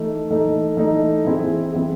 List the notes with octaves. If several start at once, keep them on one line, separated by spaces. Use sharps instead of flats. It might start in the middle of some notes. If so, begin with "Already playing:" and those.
Already playing: E3 A3 D#4
E3 A3 D#4
E3 A3 D#4
E3 C4 E4 G#4
E3 C4 E4 G#4